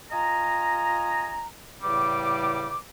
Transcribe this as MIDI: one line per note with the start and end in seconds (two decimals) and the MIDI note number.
0.10 1.46 65
0.10 1.46 75
0.10 1.46 80
0.10 1.46 82
1.82 2.77 40
1.82 2.77 45
1.82 2.77 49
1.82 2.77 55
1.82 2.77 86